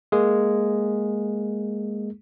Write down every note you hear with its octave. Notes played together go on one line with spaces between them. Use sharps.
G#3 A#3 G#4